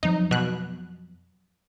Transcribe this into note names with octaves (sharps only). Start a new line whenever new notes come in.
F2 F3 F#3 D#4
B2 F#6